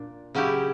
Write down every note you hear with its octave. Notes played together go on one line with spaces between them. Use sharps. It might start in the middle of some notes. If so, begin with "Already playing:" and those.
Already playing: A#2 D4
C#3 F#3 C#4 E4 G4